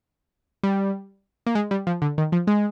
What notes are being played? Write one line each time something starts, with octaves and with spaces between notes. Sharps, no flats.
G3
A#3
G#3
G3
F3
D3
D#3
F3
G#3